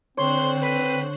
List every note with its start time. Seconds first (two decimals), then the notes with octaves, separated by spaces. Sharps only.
0.17 D3 C4 C5 C#5 C6 F#6
0.61 B4